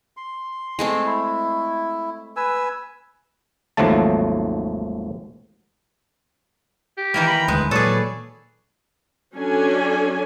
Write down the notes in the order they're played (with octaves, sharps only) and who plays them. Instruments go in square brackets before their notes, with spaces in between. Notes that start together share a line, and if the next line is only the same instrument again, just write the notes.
[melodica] C6
[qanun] G#3 A3 C4
[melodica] E4
B4 G#5 E6
[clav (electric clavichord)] G#1 D#2 F3 F#3 A3 A5
[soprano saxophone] G4
[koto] D#3 E3 A#3 [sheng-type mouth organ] G5 A#5
[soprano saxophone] B5
[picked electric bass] E1 D2 [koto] G#3 [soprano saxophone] B4
[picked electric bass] A#2 F#3 [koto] G#4 A4 [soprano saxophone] B4 [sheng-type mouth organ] C#5 D5
[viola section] F#3 C#4 D4 A4 G#5